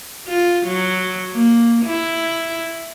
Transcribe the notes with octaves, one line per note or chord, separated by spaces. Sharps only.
F4
F#3
A#3
E4